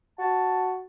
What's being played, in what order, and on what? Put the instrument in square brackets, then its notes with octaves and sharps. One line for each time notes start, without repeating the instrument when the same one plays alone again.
[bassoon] F#4 [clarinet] A5